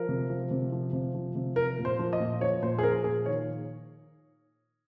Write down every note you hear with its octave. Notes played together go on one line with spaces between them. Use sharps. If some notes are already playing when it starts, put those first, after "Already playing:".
Already playing: F3 A#4
C3
F3
C3
F3
C3
F3
C3
F3 A#4
A#2
C5
F3
D#5
A#2
F3 C#5
A#2 C5
G#4
F3 A#4
A#2 G#4
D#3 C#5